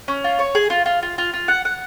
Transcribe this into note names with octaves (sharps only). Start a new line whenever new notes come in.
C#4
F4
C#5
G#4
F4
F4
F4
F4
F4
F#5
F#5